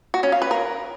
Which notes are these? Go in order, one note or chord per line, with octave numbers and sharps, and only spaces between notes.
F#4
C#4
F5
B4
A#4